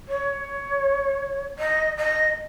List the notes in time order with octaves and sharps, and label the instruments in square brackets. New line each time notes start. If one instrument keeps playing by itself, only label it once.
[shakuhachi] C#5
D#5
D#5